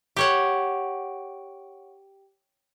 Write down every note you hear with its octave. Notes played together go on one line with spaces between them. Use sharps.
G4 C#5 F#5